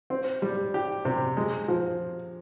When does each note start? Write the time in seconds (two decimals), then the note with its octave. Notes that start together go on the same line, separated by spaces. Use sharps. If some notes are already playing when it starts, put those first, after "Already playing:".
0.10 C4
0.42 G3
0.74 G4
1.05 C3
1.37 G#3
1.68 F3